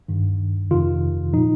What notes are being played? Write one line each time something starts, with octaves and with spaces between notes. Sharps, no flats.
G2 D#3
F2 C3 D#3 F4
A#2 F3 D#4